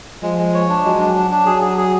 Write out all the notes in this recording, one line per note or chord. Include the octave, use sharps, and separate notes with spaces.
F3 G#3
G#3
C#5
D4
F#3 G#3
D4
D4
D4
F#3 G#4
G#4
G#4